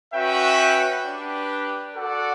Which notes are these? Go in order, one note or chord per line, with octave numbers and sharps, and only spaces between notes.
C#4 F#4 B4 E5 G5
D4 G4 B4
F#4 A4 D5 F#5